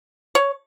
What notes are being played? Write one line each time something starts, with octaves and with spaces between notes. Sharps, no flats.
C#5